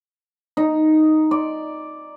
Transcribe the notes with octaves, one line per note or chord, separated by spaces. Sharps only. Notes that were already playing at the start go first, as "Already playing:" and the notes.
D#4
D5